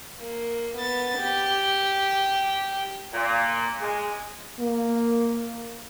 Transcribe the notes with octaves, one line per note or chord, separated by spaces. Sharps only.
A#3
B3 A6
G4
A#2
G#3
A#3